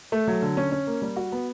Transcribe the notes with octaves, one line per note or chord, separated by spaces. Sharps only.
A3
F#3
D3
C#4
C#4
A#3
G3
F#4
B3